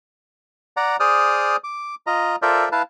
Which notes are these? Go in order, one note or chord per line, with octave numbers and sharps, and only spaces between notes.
D5 F#5 A#5
G#4 C5 D5 D#6 F6
D6
F4 D#5 A#5
F4 A4 A#4 C5 D5 E5
E4 B4 F5 A5